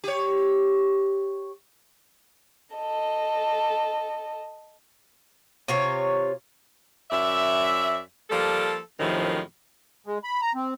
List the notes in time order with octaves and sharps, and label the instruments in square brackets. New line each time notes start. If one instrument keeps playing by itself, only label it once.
[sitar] G4 C#5
[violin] A4 D#5
[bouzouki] C3 F4 C#5
[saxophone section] F#2 D5 E5
F3 G3 A#3 A4
F#2 A2 C3 D#3 F3
[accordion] G#3
B5
A#5
C4